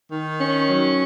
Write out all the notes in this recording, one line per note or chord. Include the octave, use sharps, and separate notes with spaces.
D#3
C#4
F#3